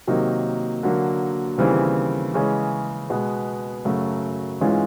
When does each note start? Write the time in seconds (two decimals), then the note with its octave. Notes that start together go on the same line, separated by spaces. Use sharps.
0.07 C3 D#3 F#3 A#3 D#4
0.83 D3 F#3 A#3
1.58 D#2 C#3 E3 G3 C4
2.34 C#3 E3 G#3 C#4
3.10 B2 G#3 B3
3.85 F#2 C#3 F#3 A3
4.61 G#2 E3 G#3 C#4 F4